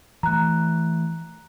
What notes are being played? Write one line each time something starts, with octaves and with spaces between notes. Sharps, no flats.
E3 A3 A#5 F#6